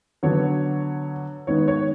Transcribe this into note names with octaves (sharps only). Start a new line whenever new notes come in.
D3 F#3 B3 C#5
D#3 G#3 B3 C#5
C#5